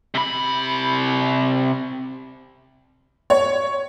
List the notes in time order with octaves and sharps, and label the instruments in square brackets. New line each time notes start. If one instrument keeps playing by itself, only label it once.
[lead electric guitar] C3 B5
[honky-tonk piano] C#5